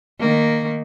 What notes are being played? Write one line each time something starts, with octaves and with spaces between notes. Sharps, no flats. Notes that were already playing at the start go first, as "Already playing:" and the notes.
D#3 A#3